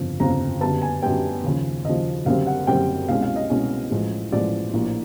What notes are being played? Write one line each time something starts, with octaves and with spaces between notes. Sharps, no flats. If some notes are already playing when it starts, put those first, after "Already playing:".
Already playing: G1 F2 C#3 F3
G1 F2 C#3 F3 A#5
F#2 D3 G3 B3 A5
G#5
F#2 D3 G3 B3 G5
D#2 C#3 F3
D#2 C#3 F3 D#5
F#1 F#2 D3 G3 C4 F5
F#5
F#1 F#2 D3 G3 C4 G5
C2 B2 G#3 C#4 F5
F5
D#5
C2 B2 G#3 C#4
A1 A2 F3 G#3
A1 A2 F3 G#3 D5
A#1 A2 F3 A#3